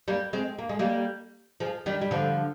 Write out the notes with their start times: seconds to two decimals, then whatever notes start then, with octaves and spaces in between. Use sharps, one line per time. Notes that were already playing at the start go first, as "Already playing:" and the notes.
0.08 G3 A#3
0.33 G#3 C4
0.58 A#3
0.69 G#3
0.79 G3 A#3
1.60 F3 G#3
1.86 D#3 G3
2.01 G3
2.11 D3 F3